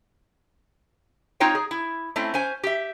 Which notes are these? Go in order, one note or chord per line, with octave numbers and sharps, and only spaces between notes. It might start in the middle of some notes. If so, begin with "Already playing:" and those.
C4 D#4 F4 C#5 G5
G#4
E4
A3 C4 C#4 E4
C#4 C5 G#5
G4 E5